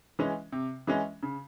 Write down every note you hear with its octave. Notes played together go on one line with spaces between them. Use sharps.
E3 G#3 C#4
C3
E3 G#3 C#4
C#3